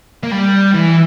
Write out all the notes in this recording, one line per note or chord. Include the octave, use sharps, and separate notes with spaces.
A#3
G3
E3